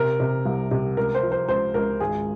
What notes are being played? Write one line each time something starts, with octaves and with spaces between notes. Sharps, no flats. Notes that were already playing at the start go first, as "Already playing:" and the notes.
Already playing: C3 A#4
C3
C2
C3
C#2 A#4
C5
F3
C5
C#2 C5
C#2 A#4
G#1 G#4